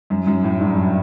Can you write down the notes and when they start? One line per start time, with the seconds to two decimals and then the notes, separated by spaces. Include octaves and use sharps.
0.10 F#2
0.27 F#2
0.44 A2
0.60 G2
0.70 F#2